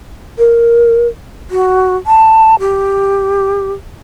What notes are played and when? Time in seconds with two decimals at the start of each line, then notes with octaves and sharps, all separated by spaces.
0.38 A#4
1.50 F#4
2.06 A5
2.60 G4